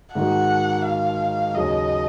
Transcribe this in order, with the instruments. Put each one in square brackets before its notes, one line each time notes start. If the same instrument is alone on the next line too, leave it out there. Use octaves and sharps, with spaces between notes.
[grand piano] G#2 D#3 A#3 D#4 F#4 [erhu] F#5
[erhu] F5
[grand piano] D#2 C#3 F#3 [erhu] D#5